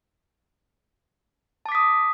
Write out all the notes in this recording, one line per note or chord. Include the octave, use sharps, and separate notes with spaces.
A5 D6 D#6 B6